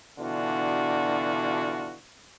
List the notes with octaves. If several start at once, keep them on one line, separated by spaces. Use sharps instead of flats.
B2 D3 E3 D4 F4 F#4